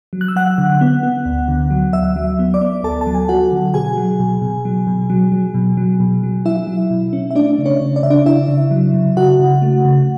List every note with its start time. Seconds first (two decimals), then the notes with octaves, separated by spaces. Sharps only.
0.13 F#3
0.21 F#6
0.28 E6
0.36 F#3 F#5 F#6
0.58 D3
0.81 B3
1.03 B3
1.26 D2
1.48 D3
1.70 F#3
1.93 D2 E5 E6
2.16 F#3
2.39 B3
2.54 D5 D6
2.61 B3
2.83 D2 A4 A5
3.01 A5
3.07 F#3
3.14 G#5
3.28 F#3 F#4 F#5
3.52 D3
3.74 B2 G#4 G#5
3.97 F#3
4.19 B2
4.42 B2
4.65 F#3
4.87 B2
5.10 F#3
5.32 F#3
5.54 B2
5.77 F#3
6.00 B2
6.23 F#3
6.45 F#3 E4 E5
6.67 F#3
6.90 B2
7.13 C#4
7.31 E5
7.35 A3 D4 D5
7.59 C#3
7.65 C#4 C#5
7.81 C#3
7.96 D5
8.03 C#3 E5
8.10 D4 D5
8.26 C#3 E4 E5
8.48 C#3
8.71 F#3
8.94 C#3
9.16 C#3 F#4 F#5
9.40 C#3
9.62 A3
9.85 C#3